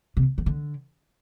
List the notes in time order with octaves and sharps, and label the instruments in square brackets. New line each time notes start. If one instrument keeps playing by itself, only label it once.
[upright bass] C3
D#3
D3